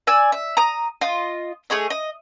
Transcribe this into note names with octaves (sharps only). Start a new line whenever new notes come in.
D5 G#5 E6
E5
A#5 D#6
F4 D#5
A3 G#4 C#5 D#5
D#5